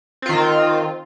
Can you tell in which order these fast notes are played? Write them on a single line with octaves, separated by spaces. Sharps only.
C4 F4 D#3